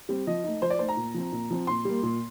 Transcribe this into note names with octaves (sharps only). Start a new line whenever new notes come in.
G3 C4
F3 D#5
A3 D#4
F3 C5
D5
A3 D#4 C5
A#5
A#2
F3 C4
A#2
F3 C4
A#2 C6
G3 A#3
A#2